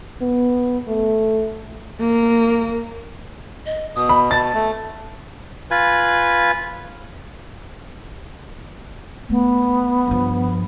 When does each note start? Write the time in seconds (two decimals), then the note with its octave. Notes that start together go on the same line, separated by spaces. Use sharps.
0.22 B3
0.88 A3
2.00 A#3
3.66 D#5
3.96 B2 D#6
4.09 B5
4.31 A5 A6
4.54 A3
5.71 F4 B4 G#5
9.29 A3 B3
10.07 G2 F3